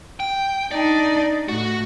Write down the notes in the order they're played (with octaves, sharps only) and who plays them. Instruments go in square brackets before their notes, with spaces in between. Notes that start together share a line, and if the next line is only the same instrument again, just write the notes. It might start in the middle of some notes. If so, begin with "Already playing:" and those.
[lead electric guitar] G5
[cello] D4 D#4 [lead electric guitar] D5
[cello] A2 [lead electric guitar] F#4